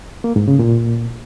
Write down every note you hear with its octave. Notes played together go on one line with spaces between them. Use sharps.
A#3
G#2
C#3
A#2